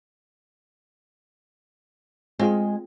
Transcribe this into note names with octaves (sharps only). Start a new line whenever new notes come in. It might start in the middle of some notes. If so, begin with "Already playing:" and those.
G#3 C4 F4 G#4